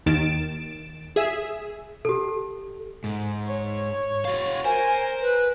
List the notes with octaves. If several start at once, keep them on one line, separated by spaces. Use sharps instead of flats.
D#2 D#3 A6 D7 E7
G#4 E5
G4 A4
G#2
C#5
F#4 F5
A#4 C5 G#5
B4